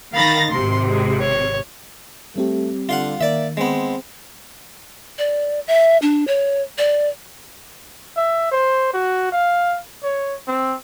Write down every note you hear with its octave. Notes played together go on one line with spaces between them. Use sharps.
D#3 F5 B5 A6 A#6
G#1 C3 C6
G#3
C#5
G3 A3 C4 G4
D3 F4 F5 F#5
D#3 A#3 D5 E5
G#3 B3 C4
D5
E5
D4
C#5
D5
E5
C5
F#4
F5
C#5
C4